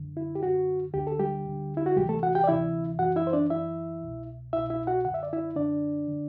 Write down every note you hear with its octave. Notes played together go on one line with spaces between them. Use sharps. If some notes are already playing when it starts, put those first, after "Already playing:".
Already playing: F#2 D3
E4
G4
F#2 D3 F#4
D2 D3 G4
A4
G3 G4
D2 D3
E4
F#4
D2 C3 E3 G3 G4
A3 A4
F#4 F#5
G4 G5
D5
D2 C3 E3 E4 E5
F#2 E3 F#4 F#5
E4 E5
C5
D4 D5
F#2 E3 E4 E5
C2 B2
C2 B2 E4 E5
E4 E5
F#4 F#5
F#2 D3 E5 F#5
D5
E4 E5
F#2 D3 D4 D5
D3